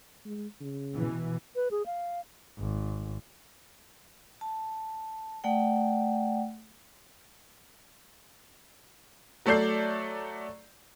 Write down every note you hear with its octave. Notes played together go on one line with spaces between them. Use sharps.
G#3
C#3
B2 E3
B4
G#4
F5
G#1
A5
A3 D5 F#5 G5
F#3 A3 A4 D5 G6 C7